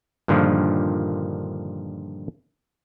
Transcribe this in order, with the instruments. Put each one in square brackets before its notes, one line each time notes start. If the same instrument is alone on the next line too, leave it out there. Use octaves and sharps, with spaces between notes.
[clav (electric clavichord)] G2 A#2 D3 D#3 F3